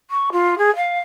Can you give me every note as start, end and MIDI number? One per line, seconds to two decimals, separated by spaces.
0.11 0.30 85
0.32 0.58 65
0.58 0.74 68
0.76 1.01 77